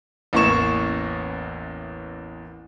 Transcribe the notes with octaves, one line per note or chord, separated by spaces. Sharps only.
A1 E2 A#3 C#4 C#6 E7